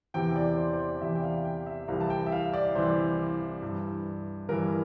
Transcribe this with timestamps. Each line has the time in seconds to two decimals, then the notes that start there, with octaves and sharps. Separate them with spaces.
0.14 E2 C3 E3 G5
0.36 D5
0.57 C5
0.73 C5
0.79 D5
0.97 D5
1.01 E2 C3 E3 E5
1.15 G5
1.23 F5
1.45 G5
1.66 E5
1.88 C2 C3 E3 F5
2.00 A5
2.10 G5
2.26 E5
2.32 F5
2.54 D5
2.75 C2 C3 E3 C5
3.62 G2 E3
4.49 G2 E3 A#4